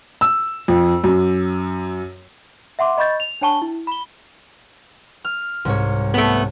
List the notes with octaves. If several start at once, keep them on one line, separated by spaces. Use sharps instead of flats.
E6
F2
F#2
E5 F#5 C6 D6
D#5 B5 C#6 G6 A6
F7
D4 C#5 G5 A5 C#6 G7
E4
B5 G7
F6
C2 G#2 C#5
A3 B3